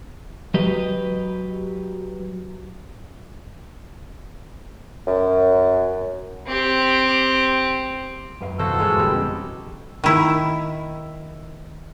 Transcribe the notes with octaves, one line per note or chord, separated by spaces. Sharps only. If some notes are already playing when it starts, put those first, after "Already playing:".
F#3 G4 B4 D#5
F#2
C4 G4
F#2 B4 F5
D#2 C3 F3 E4 F#4 A4 C5
E2 G2 A#2 F#3 G#3 B4 F5
F2 B2 D3 G3 G#3
C#4 G4
D#3 E4